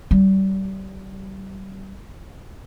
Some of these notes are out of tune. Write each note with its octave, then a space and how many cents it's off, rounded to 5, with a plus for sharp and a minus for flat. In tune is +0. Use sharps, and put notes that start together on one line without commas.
G3 -35